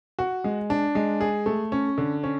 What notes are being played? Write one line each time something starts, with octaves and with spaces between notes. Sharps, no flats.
F#4
G#3
D4
G#3
G#4
A3
C#4
D3
C#4